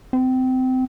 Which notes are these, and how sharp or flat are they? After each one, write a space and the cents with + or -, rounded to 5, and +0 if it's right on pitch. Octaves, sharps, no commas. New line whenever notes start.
C4 -25